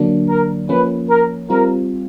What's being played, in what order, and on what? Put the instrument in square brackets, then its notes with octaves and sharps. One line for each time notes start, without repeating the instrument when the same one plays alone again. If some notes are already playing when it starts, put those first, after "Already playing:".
Already playing: [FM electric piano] D3 F#3 A#3 D4
[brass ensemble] A#4
[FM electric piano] F3 A#3 C#4 [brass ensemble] B4
[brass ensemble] A#4
[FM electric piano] G3 C4 F4 [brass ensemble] A#4